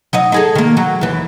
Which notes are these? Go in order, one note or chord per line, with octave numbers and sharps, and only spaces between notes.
F#3 D#4 D#5
D#4 G#4 A4
D#3 A#3
F#3
D#2 E3